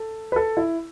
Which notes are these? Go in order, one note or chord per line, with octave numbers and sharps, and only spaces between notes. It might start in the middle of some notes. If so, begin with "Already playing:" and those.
Already playing: A4
B4
A4
E4